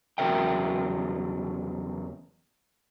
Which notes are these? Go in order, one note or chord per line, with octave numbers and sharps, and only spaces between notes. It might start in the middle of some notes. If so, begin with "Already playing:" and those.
E2 C#3 F#3 A#4 E5 G5